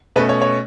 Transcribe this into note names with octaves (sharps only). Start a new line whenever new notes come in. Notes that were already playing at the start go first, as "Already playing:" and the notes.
B2 A3 C#4 B4
C#5
C#5